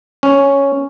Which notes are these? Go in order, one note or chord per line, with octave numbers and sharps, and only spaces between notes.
C#4